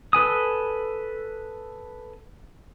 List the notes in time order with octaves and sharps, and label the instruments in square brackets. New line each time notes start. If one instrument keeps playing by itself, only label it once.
[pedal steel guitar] A4 B4 G#5 D#6